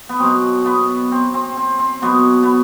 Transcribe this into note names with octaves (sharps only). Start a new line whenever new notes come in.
B3
B2 F#3 C4
B3
C4
C4
C4
C4
B2 F#3 B3
B3